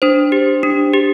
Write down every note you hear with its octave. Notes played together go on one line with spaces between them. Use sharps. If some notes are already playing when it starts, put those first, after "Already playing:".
D4 C5
G4
D4
G4